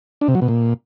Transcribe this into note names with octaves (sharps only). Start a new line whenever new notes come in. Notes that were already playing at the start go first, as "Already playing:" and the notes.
D4
C3
F#3
B2
A#2